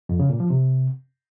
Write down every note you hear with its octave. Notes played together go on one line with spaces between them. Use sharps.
F2
C#3
A#2
F3
C3